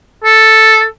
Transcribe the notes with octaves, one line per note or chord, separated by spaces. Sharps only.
A4